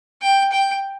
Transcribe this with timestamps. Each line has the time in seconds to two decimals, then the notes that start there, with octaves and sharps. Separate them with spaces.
0.22 G5
0.52 G5